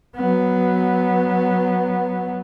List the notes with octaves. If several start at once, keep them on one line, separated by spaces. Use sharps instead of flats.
F#3 B3